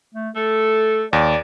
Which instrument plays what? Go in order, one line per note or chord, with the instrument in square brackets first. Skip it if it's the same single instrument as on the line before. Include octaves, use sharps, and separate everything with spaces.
[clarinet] A3
[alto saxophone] A3 [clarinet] A4
[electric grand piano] D#2 [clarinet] D5